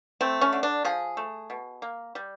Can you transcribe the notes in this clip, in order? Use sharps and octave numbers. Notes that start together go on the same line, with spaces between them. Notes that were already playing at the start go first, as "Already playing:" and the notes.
A3 C4
C#4
D3
D4
F3 G#4
A3
B2
A#3
G3